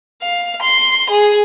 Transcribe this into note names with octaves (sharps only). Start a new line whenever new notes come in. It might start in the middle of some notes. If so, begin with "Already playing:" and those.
F5
C6
G#4